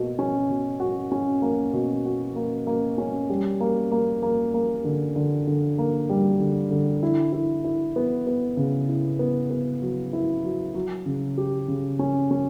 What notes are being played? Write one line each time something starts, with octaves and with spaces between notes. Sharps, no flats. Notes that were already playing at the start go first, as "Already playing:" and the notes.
Already playing: B2 A#3
C#4
B2
F#4
C#4
A#3
B2
F#4
A#3
A#3
C#4
G3
A#3
A#3
A#3
A#3
D3
D3
D3
A#3
G3
D3
D3
E4
E4
E4
B3
B3
C#3
E4
B3
B3
F#3
E4
F#3
F#3
C#3
G4
C#3
C#4
C#4